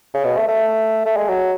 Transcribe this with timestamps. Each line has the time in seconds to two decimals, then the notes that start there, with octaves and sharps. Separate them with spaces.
0.14 C#3
0.25 B2
0.37 A3
0.48 A3
1.06 A3
1.17 G#3
1.29 F#3